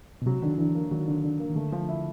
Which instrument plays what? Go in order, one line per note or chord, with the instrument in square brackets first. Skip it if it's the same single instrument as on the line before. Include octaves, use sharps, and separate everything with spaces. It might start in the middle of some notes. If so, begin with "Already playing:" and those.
[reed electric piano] B2
[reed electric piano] C3 [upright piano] F#3
[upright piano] D3 [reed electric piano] D#3
[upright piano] D3 [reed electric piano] E3
[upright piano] A#3
[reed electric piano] D#3 [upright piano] F#3
[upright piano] D3
D3
A#3
[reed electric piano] D#3
[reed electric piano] D3 [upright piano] A3
[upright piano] F3
E4